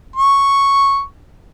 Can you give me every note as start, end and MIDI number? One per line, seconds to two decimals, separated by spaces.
0.16 1.01 85